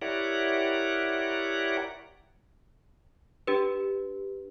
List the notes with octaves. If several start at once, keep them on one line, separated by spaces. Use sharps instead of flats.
E4 G4 A#4 C#5 D5 F#5
D4 G4 B4